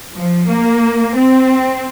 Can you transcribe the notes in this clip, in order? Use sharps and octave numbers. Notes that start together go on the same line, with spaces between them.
F3
A#3
C4